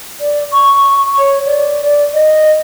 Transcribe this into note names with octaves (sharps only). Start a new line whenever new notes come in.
D5
C#6
C#5
D5
D5
D#5